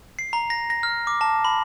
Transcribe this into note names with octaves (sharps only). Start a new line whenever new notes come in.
C7
A#5
A#6
A#6
F6
D6
A5
B5